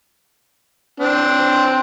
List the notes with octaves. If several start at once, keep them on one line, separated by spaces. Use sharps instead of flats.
C4 D4